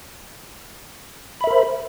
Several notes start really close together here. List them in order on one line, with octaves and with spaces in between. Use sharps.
B5 E5 A#4 C5